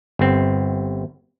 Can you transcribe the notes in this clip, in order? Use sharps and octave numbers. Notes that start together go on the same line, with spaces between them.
G1 C4